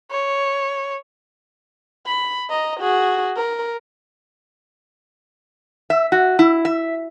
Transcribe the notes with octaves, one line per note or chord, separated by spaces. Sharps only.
C#5
B5
D#5 A#5
F#4 G#4
A#4
E5
F#4
E4
E5